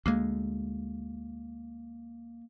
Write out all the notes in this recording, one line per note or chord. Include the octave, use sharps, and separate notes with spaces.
D2 G#3 A#3